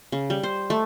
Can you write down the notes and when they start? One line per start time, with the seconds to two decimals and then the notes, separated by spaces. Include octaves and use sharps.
0.12 C#3
0.30 G3
0.43 C5
0.70 A3